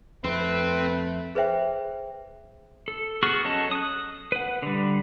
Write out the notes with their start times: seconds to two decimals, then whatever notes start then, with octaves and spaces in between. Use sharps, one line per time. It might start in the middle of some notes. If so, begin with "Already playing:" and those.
0.24 F2 A3 C4 B4
1.35 G#4 B4 C5 E5 G5
2.88 A4
3.23 B3 F#4 G#4 C#6 F6
3.44 F#3 C#4 A4 D#5 A5
3.71 D#6 F#6
4.32 B4 F#5
4.62 D3 G3